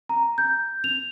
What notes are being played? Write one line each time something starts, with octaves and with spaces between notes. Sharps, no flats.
A#5
G6
F7